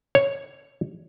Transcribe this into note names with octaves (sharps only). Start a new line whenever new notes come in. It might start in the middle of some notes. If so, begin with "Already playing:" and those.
C#5